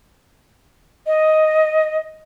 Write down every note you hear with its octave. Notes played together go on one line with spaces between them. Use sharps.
D#5